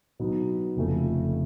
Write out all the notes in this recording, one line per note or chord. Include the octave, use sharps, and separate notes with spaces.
B2 F#3 B3 D#4
F1 F2 C#3 F3 A3